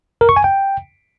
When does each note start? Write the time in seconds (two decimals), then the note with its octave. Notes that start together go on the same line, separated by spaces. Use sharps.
0.21 A#4
0.29 C#6
0.36 G#5
0.44 G5